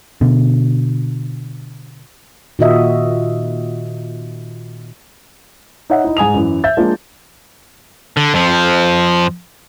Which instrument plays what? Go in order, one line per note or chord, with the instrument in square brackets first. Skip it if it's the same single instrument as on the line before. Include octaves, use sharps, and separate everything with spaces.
[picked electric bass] B2 D3
[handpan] A#2 D#3 F4 F#4 D#5 E5
[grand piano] D#4 C#5 E5 F#5
D#4 E4
G#2 G#5 D#6 F7
F#2 E3
E5 G6 A6
F3 G#3 A#3 D4 F4
[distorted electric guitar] D3
F2 F3